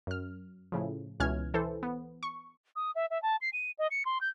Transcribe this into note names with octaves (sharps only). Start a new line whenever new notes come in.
F#2 F6
A2 C#3 F3
C#2 B2 E3 C#4 F6 G#6
E3 A4 C5
B3
C#6
D#6
E5
E5
A5
C7
D#7
D#5
C#7
C6
G6